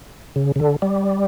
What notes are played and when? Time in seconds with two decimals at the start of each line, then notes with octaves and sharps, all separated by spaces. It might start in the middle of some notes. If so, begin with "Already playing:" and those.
0.36 C#3
0.56 C#3
0.60 D3
0.82 G3